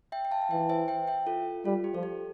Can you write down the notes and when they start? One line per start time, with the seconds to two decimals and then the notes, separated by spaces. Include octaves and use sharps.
0.12 E5 G5
0.25 G5
0.31 F5 A5
0.42 A5
0.50 E3 E5 G5
0.69 C5 E5
0.88 E5 G5
1.08 E5 G5
1.27 F4 A4
1.65 G3 F4
1.84 G4
1.94 F3 A4
2.03 G4